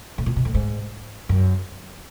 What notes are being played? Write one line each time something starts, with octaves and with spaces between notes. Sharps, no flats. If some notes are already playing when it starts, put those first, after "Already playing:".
A2
A#2
B2
A2
G#2
F#2